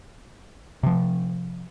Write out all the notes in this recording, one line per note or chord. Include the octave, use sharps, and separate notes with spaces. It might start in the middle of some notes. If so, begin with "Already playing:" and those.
C3 F3